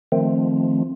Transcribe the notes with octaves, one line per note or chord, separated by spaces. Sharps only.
D#3 F3 A3 C4